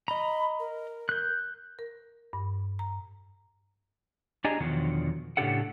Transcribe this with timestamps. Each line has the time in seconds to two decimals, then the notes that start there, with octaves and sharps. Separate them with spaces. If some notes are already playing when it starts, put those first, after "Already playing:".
0.08 D#5 A#5 B5
0.59 A#4
1.09 F#6 G6
1.79 A#4
2.33 G2
2.79 A#5
4.44 D4 G4 G#4 D#5 G#5 A#5
4.60 E2 B2 D3 D#3 F3 F#3
5.37 A2 C#3 D4 G4 A4 F#5